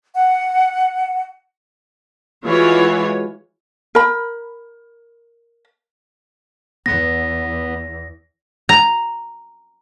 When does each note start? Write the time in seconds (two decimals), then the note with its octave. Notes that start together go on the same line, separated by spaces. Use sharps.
0.14 F#5
2.44 E3 G#3 F4 F#4 C#5
3.95 A#4 B5
6.86 E2 B3 A#6
8.69 A#5